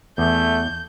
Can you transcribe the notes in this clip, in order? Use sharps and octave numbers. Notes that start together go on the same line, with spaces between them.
E2 A3 G6